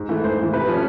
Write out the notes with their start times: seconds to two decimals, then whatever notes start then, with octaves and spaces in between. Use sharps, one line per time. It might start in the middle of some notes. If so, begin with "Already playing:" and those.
Already playing: G#2
0.09 E3 A3
0.23 G#2 C5
0.39 E3 A3
0.53 C3 B4
0.68 F3 A3 C#4